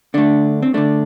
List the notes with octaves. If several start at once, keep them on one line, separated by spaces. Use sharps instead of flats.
D3 A3 D4
C4
D3 A3 D4